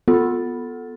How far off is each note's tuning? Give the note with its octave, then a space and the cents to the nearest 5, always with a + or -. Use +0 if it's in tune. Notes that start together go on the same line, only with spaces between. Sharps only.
B3 +0 F4 +25 A4 +0